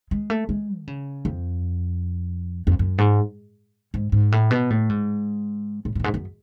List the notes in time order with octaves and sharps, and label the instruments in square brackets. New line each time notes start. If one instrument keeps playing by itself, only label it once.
[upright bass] G#3
A3
G#3
D3
C#3
F2
F2
F#2
G#2
G#2
G#2
A2
B2
A2
G#2
A2
F#2 A2
G#2
F#2